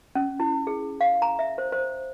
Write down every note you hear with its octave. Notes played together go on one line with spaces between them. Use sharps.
C#4
E4
G#4
F5
A#5
E5
C5
C5